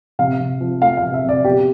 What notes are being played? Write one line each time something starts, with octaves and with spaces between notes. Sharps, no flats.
C3 F5
C3
F3
A3 F5
F5
C3
E5
C3 D5
B2 G4